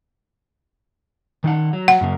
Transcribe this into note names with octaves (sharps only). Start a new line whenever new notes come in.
D#3 D#4 F#5
F#3
F#5
F#2 C#3 A#3